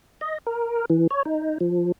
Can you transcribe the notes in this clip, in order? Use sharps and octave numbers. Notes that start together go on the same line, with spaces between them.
D#5
A#4
E3
C#5
D#4
F3